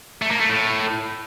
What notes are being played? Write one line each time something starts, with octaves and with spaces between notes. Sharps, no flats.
A3
A#3
A3
A2